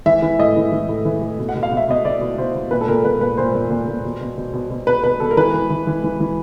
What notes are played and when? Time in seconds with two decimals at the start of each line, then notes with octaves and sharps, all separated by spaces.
0.06 E3 E5
0.22 E3
0.39 A2 D#5
0.56 E3
0.72 E3
0.89 A2
1.05 E3
1.22 A2
1.39 B2
1.49 F#5
1.55 B2
1.63 F5
1.71 B2
1.77 E5
1.88 B2 D#5
2.05 B2 D5
2.21 B2
2.38 B2 C5
2.55 B2
2.71 A#2 B4
2.81 A4
2.88 A#2 A#4
3.05 A#2 B4
3.21 A#2 B4
3.37 A#2 C5
3.54 A#2
3.70 A#2
3.88 A#2
4.04 B2
4.21 B2
4.38 B2
4.54 B2
4.70 B2
4.87 B2 B4
5.04 B2 B4
5.20 B2 A4
5.31 A#4
5.37 E3 B4
5.53 E3
5.70 E3
5.87 E3
6.04 E3
6.20 E3